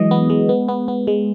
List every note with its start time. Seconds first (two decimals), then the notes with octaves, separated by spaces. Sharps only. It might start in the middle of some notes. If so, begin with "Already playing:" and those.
Already playing: E3 F#3 G#3 D#5
0.11 B3
0.30 G#3
0.49 B3
0.68 B3
0.88 B3
1.07 G#3